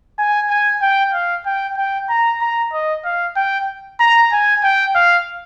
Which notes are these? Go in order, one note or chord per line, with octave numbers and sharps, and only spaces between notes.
G#5
G#5
G5
F5
G5
G5
A#5
A#5
D#5
F5
G5
A#5
G#5
G5
F5